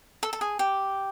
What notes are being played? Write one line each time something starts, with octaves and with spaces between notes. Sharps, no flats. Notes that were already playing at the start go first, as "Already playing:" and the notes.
A4
A4
G#4
G4